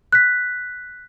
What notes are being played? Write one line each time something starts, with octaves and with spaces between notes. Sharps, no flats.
F#6 B6